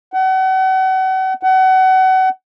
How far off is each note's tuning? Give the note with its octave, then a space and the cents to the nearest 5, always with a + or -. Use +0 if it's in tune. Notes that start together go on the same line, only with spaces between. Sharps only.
F#5 +35
F#5 +30